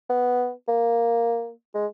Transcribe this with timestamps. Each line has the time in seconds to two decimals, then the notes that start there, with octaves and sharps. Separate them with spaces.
0.10 B3
0.68 A#3
1.75 G#3